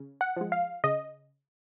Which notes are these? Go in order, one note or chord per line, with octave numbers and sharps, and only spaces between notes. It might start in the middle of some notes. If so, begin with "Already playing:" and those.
Already playing: C#3
F#5
F3 G#3
F5
C#3 D#5